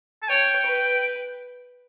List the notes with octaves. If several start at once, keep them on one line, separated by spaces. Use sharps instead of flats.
A5
C#5 G5
B4